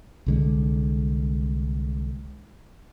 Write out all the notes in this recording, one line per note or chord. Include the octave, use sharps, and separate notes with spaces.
C2 D3 G#3